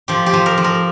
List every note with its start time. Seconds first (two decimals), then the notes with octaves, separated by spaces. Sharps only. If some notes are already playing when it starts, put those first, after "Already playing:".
0.08 F3 G4
0.26 G4
0.33 F3
0.46 A#4
0.58 F3
0.64 A#4